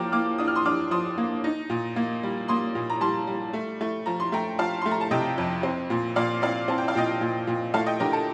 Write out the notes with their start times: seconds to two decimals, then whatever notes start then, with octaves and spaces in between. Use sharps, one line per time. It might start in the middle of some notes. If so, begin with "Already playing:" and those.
Already playing: F3 A#3 G5 A#5 D6 F6
0.12 A#3 D6 F6
0.38 D4 D#6
0.48 F6
0.56 C6 D#6
0.65 D4 D6 F6
0.91 F3 C6 D#6
1.18 A#3
1.44 D#4
1.70 A#2
1.96 A#3
2.23 G3
2.48 A#3 C6 D#6
2.75 A#2
2.90 A#5
3.01 G3 A5 C6
3.27 G3
3.53 A3
3.81 A3
4.06 F3 A#5
4.20 C6
4.32 A3 G5 A#5
4.59 F3 F5 A5
4.82 A3 C6
4.91 A#5
5.01 A5
5.11 C3 D#5 G5
5.38 F2
5.63 C4
5.90 A#2
6.16 A#2 D5 F5
6.42 C4 D5 F5
6.68 C4 A5
6.78 G5
6.88 F5
6.95 A#2 D#5 G5
7.21 A#2
7.47 A#2
7.74 A3 F5 A5
7.86 D#5 G5
8.00 D3 G4 A#4
8.13 A4